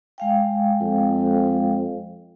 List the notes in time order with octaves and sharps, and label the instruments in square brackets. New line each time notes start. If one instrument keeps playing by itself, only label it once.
[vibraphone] G#3 F5 G5
[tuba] F2